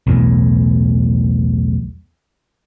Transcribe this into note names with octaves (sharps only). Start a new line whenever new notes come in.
B1 E2 A2